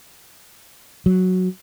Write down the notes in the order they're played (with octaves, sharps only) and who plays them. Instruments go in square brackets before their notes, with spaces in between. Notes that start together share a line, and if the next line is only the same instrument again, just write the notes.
[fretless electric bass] F#3